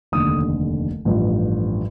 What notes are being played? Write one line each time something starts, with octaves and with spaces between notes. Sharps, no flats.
F1 D#2 D3 D#6
A1 G2 F3